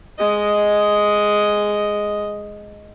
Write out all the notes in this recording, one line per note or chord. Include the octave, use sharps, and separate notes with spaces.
G#3 D#5